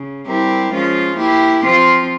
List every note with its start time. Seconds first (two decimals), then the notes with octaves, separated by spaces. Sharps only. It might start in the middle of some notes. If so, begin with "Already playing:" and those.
Already playing: C#3
0.26 G3 C4 E4 G4 A#4
0.71 F3 G#3 C#4 F4
1.16 A#3 E4 G4
1.61 F3 C4 F4